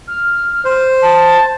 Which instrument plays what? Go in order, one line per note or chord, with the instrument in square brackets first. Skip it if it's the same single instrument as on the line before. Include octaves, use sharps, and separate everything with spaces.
[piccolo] F6
[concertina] C5
[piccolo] A5